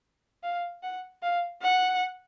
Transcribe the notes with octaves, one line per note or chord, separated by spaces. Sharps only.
F5
F#5
F5
F#5